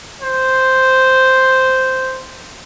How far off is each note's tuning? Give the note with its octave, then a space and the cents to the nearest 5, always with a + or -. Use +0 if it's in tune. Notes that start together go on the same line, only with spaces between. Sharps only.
C5 -5